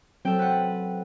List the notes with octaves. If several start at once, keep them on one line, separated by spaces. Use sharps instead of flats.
F#3 C4 A4 G5
B4 F#5